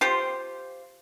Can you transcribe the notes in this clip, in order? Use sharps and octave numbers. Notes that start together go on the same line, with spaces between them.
F4 G4 C5